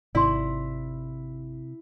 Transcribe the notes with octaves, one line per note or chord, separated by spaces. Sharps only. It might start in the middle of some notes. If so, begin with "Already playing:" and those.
G#1 C3 E4 D5 C6